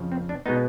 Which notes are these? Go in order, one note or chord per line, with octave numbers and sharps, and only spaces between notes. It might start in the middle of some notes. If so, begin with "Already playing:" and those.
Already playing: F2 C#3 F3
C4
D4
B2 G#3 B3 D#4